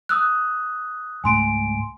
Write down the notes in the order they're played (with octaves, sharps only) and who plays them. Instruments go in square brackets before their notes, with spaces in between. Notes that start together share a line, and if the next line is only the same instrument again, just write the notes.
[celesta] D#6 E6 F#6
[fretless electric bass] C#2 G#2 A3 [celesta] G#5 C6 D7